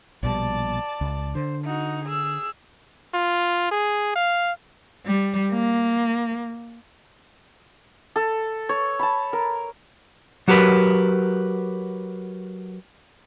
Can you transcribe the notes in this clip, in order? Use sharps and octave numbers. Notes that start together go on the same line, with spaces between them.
A#1 B2 G3 D5 A5
C#2
D3 C5
D#4 F#4
G#4 E6
F4
G#4
F5
G3
A#3
A4
C#5
A5 B5
A#4
F#3 F#4 G4 A#4 B4